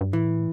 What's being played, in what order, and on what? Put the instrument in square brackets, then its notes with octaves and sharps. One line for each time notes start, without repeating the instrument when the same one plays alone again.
[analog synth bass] G2
[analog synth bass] A2 [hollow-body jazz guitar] E3